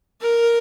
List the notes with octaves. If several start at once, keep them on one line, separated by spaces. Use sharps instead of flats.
A#4